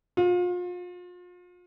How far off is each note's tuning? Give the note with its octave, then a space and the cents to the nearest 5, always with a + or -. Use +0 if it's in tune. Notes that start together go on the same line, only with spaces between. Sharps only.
F4 +35